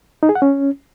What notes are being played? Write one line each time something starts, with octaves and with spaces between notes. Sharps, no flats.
D#4
G#4
F#5
C#4